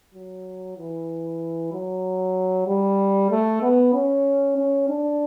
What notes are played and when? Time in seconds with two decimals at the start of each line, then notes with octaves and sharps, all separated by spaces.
0.15 F#3
0.78 E3
1.73 F#3
2.67 G3
3.31 A3
3.62 B3
3.94 C#4
4.57 C#4
4.89 D4